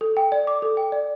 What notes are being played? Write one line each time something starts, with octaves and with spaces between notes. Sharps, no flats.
A4
G5
D5
D6
A4
G5
D5